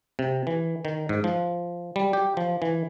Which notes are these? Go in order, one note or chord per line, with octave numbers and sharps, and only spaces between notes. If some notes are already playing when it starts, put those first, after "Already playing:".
C3
E3
D#3
G#2
F3
G3
G4
F3
E3